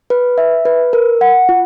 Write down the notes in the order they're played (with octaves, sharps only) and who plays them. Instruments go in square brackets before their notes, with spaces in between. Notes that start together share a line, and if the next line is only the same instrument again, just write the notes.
[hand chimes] B4
E5
B4
A#4
F#5
F4